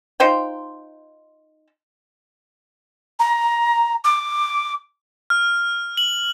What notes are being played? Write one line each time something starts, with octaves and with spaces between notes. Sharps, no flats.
D#4 F4 C5 G5
A#5
D6
F6
F#7